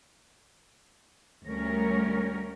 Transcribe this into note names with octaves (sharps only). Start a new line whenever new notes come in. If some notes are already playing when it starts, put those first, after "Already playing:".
D2 G3 C#4 A#4 C#5